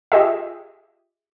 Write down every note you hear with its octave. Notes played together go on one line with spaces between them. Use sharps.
F4 G4 G#4 D#5 E5